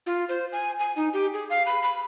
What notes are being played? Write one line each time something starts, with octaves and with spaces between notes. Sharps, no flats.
F4
C5
G#5
G#5
D#4
G4
G#4
F5
B5
B5